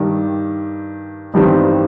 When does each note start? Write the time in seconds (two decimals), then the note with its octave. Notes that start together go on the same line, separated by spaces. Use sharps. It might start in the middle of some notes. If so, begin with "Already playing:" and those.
Already playing: G2 D#3 G3
1.34 A1 G2 D#3 G3 C4